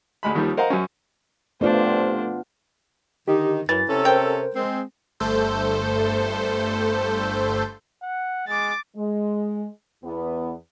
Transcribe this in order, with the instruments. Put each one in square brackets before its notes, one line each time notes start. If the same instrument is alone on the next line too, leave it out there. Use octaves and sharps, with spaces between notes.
[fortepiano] D2 G#3 B5
D#2 D#3 F3 G3
A#4 C5 D#5 F5 F#5 A#5
F#2 C#4
[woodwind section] G2 C3 [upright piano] A3 D5 [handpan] B3 F4 [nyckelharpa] D4 C5
[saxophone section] D3 D#3 D#4 [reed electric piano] G4
[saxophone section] F#2 [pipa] E3 [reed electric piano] A6
[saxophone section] C3 C#4 A4
[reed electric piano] A#4 C5 [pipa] G5
[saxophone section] G#3 C4
[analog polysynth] G1 G2 A3 A4 C5 G6
[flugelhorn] F#5
[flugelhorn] G#3 [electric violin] D6 A6
[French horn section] G#3
E2 B3